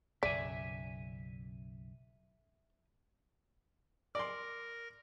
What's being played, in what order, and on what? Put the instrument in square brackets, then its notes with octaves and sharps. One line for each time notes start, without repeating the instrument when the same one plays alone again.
[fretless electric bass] B1 F#2 C#3 [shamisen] D5 [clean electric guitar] E5 G#5
[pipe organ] A#4 A#6 [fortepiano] D5 C6